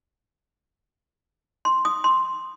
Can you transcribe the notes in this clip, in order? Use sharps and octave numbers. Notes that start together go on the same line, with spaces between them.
C6
D#6
C6